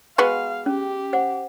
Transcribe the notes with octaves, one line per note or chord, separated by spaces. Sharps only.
G#3 B3 F#4 F5
C#4 G4
C5 F#5